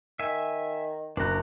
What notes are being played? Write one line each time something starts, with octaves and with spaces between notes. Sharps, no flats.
D#3 E5 G#5
F#1 D4 A#5 F#6